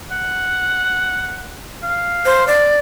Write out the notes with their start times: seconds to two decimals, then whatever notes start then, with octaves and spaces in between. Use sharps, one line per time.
0.11 F#5
1.83 F5
2.26 C5
2.47 D5